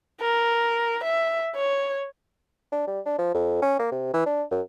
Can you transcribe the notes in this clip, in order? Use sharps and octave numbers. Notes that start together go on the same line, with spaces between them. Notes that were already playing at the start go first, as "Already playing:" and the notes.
A#4
E5
C#5
D4
G3
D4
F3
F2
C#4
A#3
C3
E3
D4
F#2